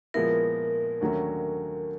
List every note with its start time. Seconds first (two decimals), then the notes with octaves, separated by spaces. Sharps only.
0.14 A#2 F3 G#3 B3 E4 A#4
1.01 D#2 D3 F#3 A3 C#4